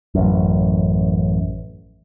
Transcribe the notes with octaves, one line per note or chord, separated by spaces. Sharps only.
A1 F#2